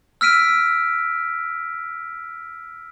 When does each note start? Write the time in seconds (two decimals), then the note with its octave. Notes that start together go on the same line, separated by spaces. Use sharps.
0.21 E6 F6 B6 D7 D#7